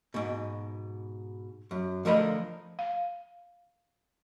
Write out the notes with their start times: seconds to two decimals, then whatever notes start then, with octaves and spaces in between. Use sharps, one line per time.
0.14 G#2 B2
1.71 F#2
2.05 D3 F3 A3 A#4 D#5 B5
2.79 F5